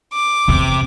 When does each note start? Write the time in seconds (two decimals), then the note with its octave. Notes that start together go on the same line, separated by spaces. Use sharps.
0.13 D6
0.48 E2 C3